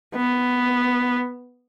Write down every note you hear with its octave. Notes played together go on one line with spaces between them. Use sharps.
B3